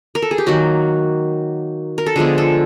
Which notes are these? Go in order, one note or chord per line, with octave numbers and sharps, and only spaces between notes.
A#4
A4
G#4
G4
D#3 F#3 A#3 F#4
A#4
A4
D3 F3 G#3 B3 G#4
A4